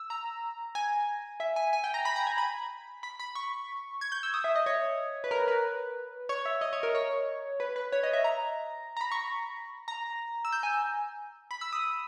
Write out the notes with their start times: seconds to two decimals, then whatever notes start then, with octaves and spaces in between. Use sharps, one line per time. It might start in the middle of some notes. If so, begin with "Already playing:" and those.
Already playing: E6
0.10 A#5
0.75 G#5
1.40 E5
1.56 G#5
1.73 G#5
1.84 G5
1.94 A#5
2.05 B5
2.16 A#5
2.27 G#5
2.38 B5
3.03 B5
3.20 B5
3.35 C#6
4.01 G#6
4.12 G6
4.23 E6
4.34 D#6
4.44 E5
4.56 D#5
4.66 C#5
5.24 B4
5.31 A#4
5.48 B4
6.29 C#5
6.46 E5
6.61 D#5
6.73 C#5
6.83 A#4
6.95 C#5
7.60 B4
7.76 B4
7.92 C#5
8.03 D#5
8.13 E5
8.24 A#5
8.97 A#5
9.01 B5
9.12 C#6
9.88 A#5
10.45 E6
10.52 G6
10.63 G#5
11.51 B5
11.61 E6
11.73 D#6